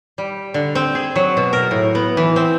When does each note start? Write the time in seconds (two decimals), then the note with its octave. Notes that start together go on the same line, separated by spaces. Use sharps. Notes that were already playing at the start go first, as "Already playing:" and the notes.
0.18 G3
0.54 D3
0.75 C4
0.95 G#4
1.16 F#3
1.37 B2
1.53 A#4
1.71 A2
1.95 B3
2.17 E3
2.36 C4